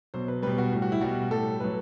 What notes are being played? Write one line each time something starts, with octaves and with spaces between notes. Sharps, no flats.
B2 F#3 C5
B4
B2 G3 B4
F#4
A2 G3
F#4
E4
B2 G3 F#4
A2 G3 A4
A2 F#3 B4